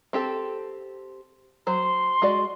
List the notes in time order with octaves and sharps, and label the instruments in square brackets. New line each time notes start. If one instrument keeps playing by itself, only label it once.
[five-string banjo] C4 G4 A4
[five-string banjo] F#3 C5 [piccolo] C6
[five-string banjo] G#3 F#4 D5